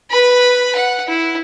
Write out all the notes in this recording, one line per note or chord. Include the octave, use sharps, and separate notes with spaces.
B4 B5
F#5
E4